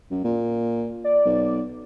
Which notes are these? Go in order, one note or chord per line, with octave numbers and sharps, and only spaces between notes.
F#2
A#2
D5
B1